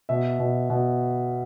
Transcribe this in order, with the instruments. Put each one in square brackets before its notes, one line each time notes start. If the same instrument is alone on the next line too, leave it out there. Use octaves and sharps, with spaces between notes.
[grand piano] B2 E5
B2
B2